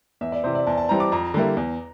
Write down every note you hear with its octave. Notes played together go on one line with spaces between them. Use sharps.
E2 E5
D5
C3 E3 C5
D5
E2 A5
A5
E3 G3 C4 A#5
D6
F2 A#5
D3 G3 A#3 E4
E2